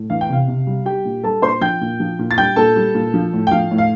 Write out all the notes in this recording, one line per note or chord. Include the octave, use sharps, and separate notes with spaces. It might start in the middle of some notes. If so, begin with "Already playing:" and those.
Already playing: A2
E3 F5
G5
C3 F5
C3
G3
G3 G4 G5
A#2
G3 A4 A5
A#2 C5 C6
F3 G5 G6
A#2
F3
A#2
A6
G3 G5 G6
A#2 A4 A5
G3
A#2
F3
A2
G5
F3 F5
A2
F5